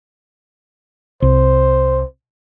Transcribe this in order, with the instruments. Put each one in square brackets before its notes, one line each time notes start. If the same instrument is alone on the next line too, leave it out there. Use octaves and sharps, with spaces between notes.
[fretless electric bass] C2 [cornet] C5